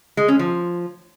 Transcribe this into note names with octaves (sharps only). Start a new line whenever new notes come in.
G#3
C#4
F3